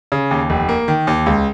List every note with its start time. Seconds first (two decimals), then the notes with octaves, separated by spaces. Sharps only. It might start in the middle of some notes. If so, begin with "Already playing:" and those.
0.12 C#3
0.31 D#2
0.50 F1
0.69 A#3
0.88 D#3
1.07 D#2
1.26 C#2